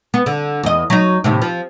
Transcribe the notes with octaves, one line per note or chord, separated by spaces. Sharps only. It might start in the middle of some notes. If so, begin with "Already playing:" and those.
B3
D3
E2 D#5
F#3 D#4
D#2 A2 C3
F3